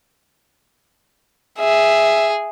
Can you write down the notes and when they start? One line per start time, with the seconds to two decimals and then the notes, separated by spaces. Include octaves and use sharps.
1.60 G#4 E5